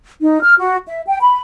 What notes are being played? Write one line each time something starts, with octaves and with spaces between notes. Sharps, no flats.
D#4
F6
F#4
E5
G5
B5